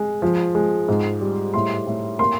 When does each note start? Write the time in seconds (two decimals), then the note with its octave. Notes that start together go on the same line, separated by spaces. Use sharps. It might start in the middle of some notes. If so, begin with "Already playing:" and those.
Already playing: G#3
0.22 F3
0.55 G#3
0.88 G#2
1.21 G3
1.54 A2 C6
1.87 A2
2.19 A#3 C6